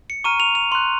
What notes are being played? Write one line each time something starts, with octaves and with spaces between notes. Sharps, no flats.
C#7
A#5 C#6 F6 D#7
F7
F7
C6 F#6